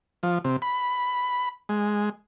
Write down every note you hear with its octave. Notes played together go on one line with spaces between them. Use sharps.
F3
C3
B5
G#3